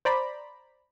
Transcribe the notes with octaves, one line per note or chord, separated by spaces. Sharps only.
C5 D5 A#5 B5